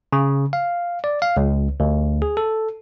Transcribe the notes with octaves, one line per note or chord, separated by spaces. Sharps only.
C#3
F5
D5
F5
C#2
D2
G#4
A4